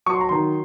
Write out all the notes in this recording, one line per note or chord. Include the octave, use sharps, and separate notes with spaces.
F#3 C#6
C6
A#5
D#3 C6